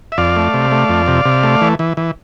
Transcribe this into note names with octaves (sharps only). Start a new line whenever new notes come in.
E5
F2 D5 F5
A3
C3
A3
F2
C3
C3
A3
E3
E3
E3